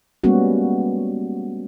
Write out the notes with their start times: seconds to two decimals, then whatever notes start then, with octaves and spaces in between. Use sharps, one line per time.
0.24 G3 G#3 A#3 B3 C#4 F#4